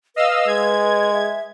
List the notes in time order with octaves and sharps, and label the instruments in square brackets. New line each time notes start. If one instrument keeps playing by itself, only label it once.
[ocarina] B4 [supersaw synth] D#5 F5 E6
[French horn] G#3 [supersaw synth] G#6
[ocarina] E5